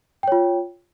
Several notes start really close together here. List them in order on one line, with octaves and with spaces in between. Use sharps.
G5 C#5 F4